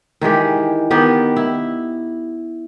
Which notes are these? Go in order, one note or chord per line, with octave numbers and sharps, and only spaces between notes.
D#3 E3 G#3 G4
D#3 B3 G4
E4